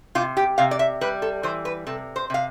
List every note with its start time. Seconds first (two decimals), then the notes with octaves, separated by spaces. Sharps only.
0.15 C3 F4
0.37 G4
0.58 C3 F5
0.71 D5
0.79 E5
1.01 G3 B4
1.22 A4
1.43 E3 C5
1.65 B4
1.87 C3 A4
2.16 C5
2.30 C3 F5